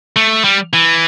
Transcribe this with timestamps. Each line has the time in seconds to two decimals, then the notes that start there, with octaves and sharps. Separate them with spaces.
0.16 A3
0.44 G3
0.73 E3